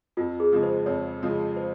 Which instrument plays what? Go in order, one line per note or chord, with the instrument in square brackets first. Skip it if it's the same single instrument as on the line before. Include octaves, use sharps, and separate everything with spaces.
[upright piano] F2 [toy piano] F4
[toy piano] G#4
[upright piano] C#3 F3 G#3
[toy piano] C5
[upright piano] F2 [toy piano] C#5
[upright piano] C#3 F3 G#3
[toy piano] C5